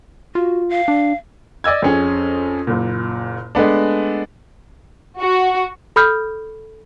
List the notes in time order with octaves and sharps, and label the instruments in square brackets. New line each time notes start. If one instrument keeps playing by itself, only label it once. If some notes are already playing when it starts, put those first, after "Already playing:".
[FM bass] F4 [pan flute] F#4
[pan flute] F5
[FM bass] D4
[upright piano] D5 D#5 E6 G#6
F2 C#4 G#4
F#1 A#2
G#3 A3 B3 D4
[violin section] F#4
[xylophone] A4 B5 D#6 F6 G6